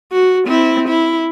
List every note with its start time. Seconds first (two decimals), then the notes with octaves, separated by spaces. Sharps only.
0.12 F#4
0.47 C4 E4
0.89 E4